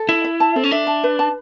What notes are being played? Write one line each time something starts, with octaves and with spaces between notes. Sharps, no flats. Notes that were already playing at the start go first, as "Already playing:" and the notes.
Already playing: A4
E4 E5
E5
A5
C4 A4
C#4
D4 E5
A5
B4
A5